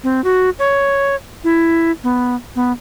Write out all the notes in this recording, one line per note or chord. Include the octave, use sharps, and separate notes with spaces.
C4
F#4
C#5
E4
B3
B3